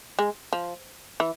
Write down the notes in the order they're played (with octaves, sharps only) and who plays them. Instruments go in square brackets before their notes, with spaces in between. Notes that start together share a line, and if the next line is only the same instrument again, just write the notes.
[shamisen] G#3
F3
E3